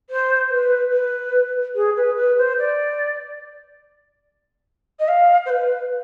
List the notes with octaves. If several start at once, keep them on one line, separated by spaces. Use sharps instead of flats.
C5
B4
B4
G#4
B4
B4
C5
D5
D#5
F5
C5
B4